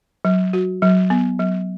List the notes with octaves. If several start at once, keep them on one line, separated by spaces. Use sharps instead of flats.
F#3
F#4
F#3
B3
F#3